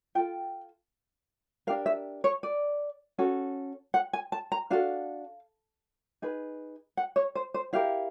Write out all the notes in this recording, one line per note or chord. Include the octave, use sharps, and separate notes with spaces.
F4 A4 G5
D4 G4 A#4 F5
E5
C#5
D5
C#4 F#4 A4
F#5
G#5
A5
A#5
D4 F#4 A4 F5
D#4 G#4 B4
F#5
C#5
C5
C5
E4 G4 A#4 F5